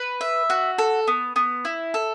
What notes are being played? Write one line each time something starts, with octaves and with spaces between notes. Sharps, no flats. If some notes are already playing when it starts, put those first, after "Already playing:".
Already playing: B4
E5
F#4
A4
B3
B3
E4
A4